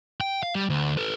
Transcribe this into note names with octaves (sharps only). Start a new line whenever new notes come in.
G5
F5
G3
D2
A4 B4